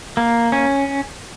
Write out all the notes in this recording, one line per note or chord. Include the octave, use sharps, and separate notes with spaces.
A#3
C#4